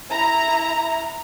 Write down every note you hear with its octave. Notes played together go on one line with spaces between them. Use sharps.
E4 A#5